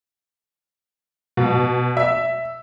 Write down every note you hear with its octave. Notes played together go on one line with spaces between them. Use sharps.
B2
E5